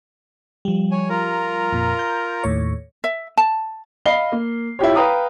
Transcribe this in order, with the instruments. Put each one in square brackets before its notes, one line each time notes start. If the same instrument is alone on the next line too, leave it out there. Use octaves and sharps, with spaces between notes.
[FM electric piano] F3 G3
[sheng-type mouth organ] C#5 G#5
F4 A#4 A#5
[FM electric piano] F2 A#2
G6
D#2 A2 C#5
[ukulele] E5
A5
[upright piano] D#5 F5 B5 C7 G7
A#3
E4 F4 G4 C#5
B4 F5 G5 A#5 D#6